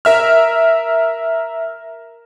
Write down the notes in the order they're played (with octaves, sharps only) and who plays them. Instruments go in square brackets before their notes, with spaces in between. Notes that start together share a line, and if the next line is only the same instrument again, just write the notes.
[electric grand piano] A#4 E5 F6